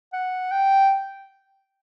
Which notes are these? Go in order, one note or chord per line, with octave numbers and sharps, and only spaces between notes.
F#5
G5